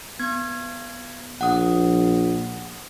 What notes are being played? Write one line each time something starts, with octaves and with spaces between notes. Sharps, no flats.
B3 G#6
A#1 F#5 D#6